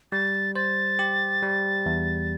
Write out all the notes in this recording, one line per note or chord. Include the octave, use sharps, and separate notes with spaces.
G3 A6
C5 A6
G4
G3
E2